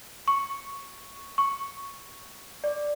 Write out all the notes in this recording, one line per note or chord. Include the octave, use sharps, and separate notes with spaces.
C#6
C#6
D5